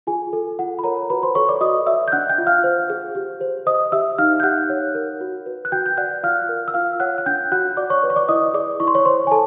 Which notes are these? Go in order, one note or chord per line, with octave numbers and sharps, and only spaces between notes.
F4 G#4 G#5
A4
F4 F#5
B5
A#4 C#5 A#5
F#4 B4 B5
C5 C6
A4 C#5 C#6
D5 D6
F#4 D#5 D#6
D5 E5 E6
G6
D4 F#5 F#6
G5 G6
F4
F5 F6
C5
G#4
G4
C5
C5 D#5 D#6
G4 E5 E6
D#4 F5 F6
G6
G4 F#5 F#6
C#5
A#4
F#4
B4
F#6
F#4 G5 G6
G6
D5 F#5 F#6
F4 F5 F6
A#4
E6
F4 F5 F6
C#5 F#5 F#6
F#6
D4 G5 G6
F#4 F#5 F#6
D5 D6
C#5 C#6
B4
C#6
D5 D6
E4 D#5 D#6
G#4 D5 D6
E4 C#6
C6
C#5 C#6
C5 C#5 C6
G#5
A4 A5